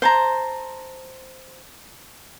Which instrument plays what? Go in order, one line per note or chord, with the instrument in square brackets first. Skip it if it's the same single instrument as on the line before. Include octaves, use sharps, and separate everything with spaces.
[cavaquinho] C5 A5 A#5